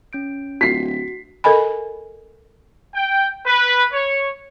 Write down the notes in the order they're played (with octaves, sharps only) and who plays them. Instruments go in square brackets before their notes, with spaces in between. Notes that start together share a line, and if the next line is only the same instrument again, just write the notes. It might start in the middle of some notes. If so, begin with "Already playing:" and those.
[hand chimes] C#4 G6 D7
[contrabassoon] D1 [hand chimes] F#4 [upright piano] B6 C7
[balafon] A4 A#4 D#5 G#5 B5
[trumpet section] G5
B4
C#5